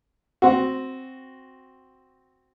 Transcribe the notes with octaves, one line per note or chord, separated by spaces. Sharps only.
C4 F#4